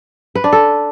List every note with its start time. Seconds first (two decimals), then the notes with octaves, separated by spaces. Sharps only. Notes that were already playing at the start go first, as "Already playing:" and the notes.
0.35 B4
0.44 D4
0.53 A4